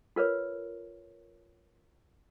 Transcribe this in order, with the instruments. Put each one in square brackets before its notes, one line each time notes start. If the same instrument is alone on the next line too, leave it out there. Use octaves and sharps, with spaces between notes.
[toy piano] F4 A#4 B4 C#5